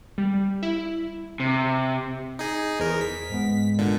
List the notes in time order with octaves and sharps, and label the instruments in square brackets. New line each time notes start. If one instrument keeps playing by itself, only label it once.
[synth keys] G3
E4
[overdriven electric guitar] C3
[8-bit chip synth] D#4 G#4
[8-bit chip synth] E2 A#4 [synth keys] G#4 C5
[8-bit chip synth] B6
[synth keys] G#2 G#3 B3
[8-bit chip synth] A#2 D3